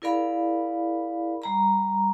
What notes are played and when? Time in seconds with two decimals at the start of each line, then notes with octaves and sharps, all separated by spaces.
0.02 E4 G#4 A#4 D5 F5 B5
1.42 G3 A#5 B5